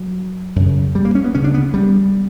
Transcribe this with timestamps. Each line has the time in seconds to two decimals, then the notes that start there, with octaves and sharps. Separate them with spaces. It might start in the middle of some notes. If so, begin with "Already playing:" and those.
Already playing: F#3
0.56 F#2 C#3
0.95 G3
1.05 A#3
1.15 C#4
1.24 B3
1.34 D2 C#3 C#4
1.44 D4
1.54 B3
1.74 G3